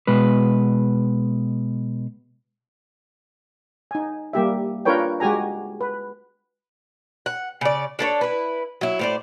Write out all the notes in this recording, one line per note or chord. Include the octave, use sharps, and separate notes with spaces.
B2 G#3 B4
D#4 G#5
G3 A#3 G4 E5
D4 F4 A#4 B4 C#5 G5
G#3 F#4 G4 G#5 A#5
B4
F#5
C#3 D5
D4 A4 B4 C#5
E4 B4
F#3 E4
A2 C5 D5